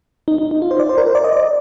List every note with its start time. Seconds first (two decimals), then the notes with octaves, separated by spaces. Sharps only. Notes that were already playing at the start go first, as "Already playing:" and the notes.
0.28 D#4
0.38 D#4
0.51 D#4
0.62 F4
0.71 C5
0.80 D5
0.89 C5
0.98 A#4
1.07 C5
1.15 D5
1.24 D#5
1.33 D5